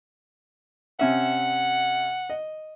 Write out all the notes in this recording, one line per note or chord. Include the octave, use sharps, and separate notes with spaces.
C3 C#4 E5 F#5
D#5